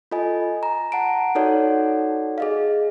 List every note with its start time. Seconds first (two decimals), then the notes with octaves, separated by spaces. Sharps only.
0.12 F4 A4 D#5 G#5
0.63 A#5
0.92 F#5 A5 A#5 D7
1.35 D#4 F#4 A4 C#5 D5 F#5
2.38 G#4 D#5 F5